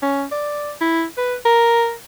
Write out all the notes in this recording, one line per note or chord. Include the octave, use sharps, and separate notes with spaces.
C#4
D5
E4
B4
A#4